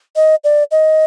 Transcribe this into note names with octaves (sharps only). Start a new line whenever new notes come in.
D#5
D5
D#5